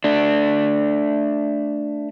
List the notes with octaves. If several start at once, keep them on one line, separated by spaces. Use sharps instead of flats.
A3 D4